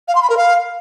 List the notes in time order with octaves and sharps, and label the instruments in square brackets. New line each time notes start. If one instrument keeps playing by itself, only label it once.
[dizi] F5
C6
B5
A#4
F5